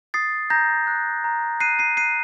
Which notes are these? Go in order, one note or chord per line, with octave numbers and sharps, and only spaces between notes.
D#6 A6 C7
A#5 G6 A#6
F#6
A#5
F#6 C7 D#7
C7 D#7
F#6 C7 D#7